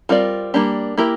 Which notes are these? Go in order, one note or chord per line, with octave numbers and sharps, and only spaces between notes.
G3 C4 F4 A#4 D5
G3 A#3 D4 G4
A#3 E4 G4 A#4